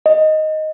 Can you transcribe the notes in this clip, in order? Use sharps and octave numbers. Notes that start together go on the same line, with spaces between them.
D#5